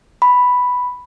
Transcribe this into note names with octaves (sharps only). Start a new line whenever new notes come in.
B5